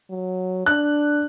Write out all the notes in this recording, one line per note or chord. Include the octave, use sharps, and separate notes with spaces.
F#3
D4 F#6